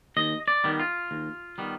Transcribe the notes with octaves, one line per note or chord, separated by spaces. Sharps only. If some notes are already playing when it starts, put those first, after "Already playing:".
D#2 D#5
D5
D#3 G3 B3
F4
D#2
D#3 G3 B3